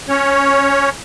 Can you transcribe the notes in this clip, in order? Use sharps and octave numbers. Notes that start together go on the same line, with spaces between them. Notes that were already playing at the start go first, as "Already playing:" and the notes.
C#4 C#5